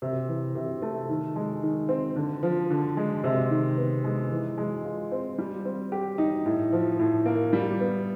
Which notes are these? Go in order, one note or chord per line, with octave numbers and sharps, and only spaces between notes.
C3
E3
C3
A3
D#3
G#3
D#3
C4
D3
F3
D3
G#3
C3
D#3
B3
G#3
E3
G#3
F4
C4
G3
C4
G4
D#4
A2
F3
A2
A#3
G3
B3